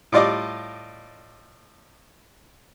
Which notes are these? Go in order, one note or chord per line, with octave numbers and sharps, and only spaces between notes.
A2 G3 F4 D5 D#5 D6